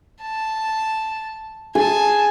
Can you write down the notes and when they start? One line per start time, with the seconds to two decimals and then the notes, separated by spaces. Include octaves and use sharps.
0.22 A5
1.75 G#4 G#5 A5